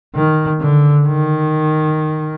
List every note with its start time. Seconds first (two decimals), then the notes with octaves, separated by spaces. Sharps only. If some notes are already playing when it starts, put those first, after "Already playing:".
0.15 D#3
0.60 D3
1.07 D#3